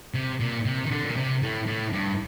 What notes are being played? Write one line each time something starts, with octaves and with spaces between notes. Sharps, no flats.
C3
A#2
C3
D#3
D3
A#2
C3
A2
A2
G2